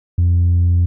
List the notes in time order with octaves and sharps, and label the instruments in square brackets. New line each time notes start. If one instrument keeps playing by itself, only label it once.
[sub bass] F2